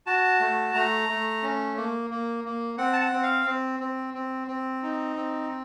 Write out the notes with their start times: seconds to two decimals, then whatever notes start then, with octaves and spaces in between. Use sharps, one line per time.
0.06 F#4 A5
0.40 A3
0.74 A3 A#5
1.09 A3
1.43 C#4
1.77 A#3
2.10 A#3
2.44 A#3
2.78 C4 F#5
2.93 A5
3.01 F#5
3.13 C4
3.23 F5
3.46 C4
3.80 C4
4.14 C4
4.48 C4
4.83 D#4
5.16 C4